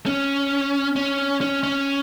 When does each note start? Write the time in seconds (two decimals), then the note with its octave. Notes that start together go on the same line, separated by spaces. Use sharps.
0.06 C#4
0.96 C#4
1.41 C#4
1.63 C#4